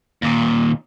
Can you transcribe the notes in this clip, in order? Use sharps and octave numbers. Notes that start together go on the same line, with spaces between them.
D#2 A#2